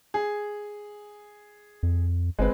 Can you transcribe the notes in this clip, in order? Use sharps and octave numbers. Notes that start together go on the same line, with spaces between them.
G#4
F2
G1 G#3 C4 B4